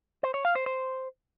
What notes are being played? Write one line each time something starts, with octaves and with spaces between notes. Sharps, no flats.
C5
C#5
F5
C5
C5